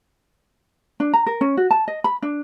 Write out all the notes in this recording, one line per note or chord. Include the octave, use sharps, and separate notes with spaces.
D4
A#5
A#4
C#4
F#4
A5
D#5
B5
D4